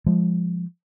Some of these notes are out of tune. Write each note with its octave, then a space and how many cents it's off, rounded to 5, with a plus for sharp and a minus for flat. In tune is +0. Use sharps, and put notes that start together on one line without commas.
F3 +0 G#3 -15